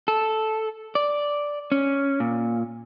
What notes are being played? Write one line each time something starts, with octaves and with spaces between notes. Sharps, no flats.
A4
D5
C#4
A#2